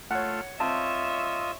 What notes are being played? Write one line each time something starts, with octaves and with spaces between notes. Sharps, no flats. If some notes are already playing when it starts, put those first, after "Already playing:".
A3 F4 C#5 F#5
C4 F4 C#5 D#5 E5 A5 E6